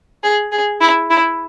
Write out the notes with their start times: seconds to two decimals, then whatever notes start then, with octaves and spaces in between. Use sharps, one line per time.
0.23 G#4
0.52 G#4
0.81 E4
1.10 E4